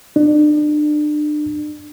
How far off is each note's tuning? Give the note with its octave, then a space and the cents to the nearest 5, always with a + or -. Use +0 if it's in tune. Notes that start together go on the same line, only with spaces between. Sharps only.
D4 +35